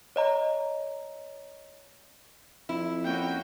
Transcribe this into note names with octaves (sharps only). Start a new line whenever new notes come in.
C#5 D#5 A#5
F2 E4
A#3 C#4 F#4 G5